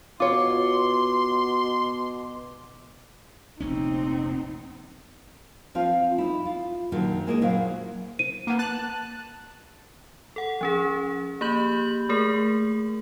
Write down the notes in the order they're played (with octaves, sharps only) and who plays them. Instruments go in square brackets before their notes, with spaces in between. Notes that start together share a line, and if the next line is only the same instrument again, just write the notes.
[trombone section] B2 [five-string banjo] F4 C#5 [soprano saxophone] C6 [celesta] D6
[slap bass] F1 A#1 C#4 [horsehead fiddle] C4 D#4
[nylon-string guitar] F3 C4 F4 F5
D#4 E4
F4
A#2 D3 D#3 F3 F#3
G#3 A#3 E4 D5 D#5
A#2 F#3 E4 C5 F5
[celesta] D#7
[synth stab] A#3 B3
A5 F#6
[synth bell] A4 F#5
F3 C#4 G#4
A#3 G4 B5 G6 F#7
A3 G#4 A#4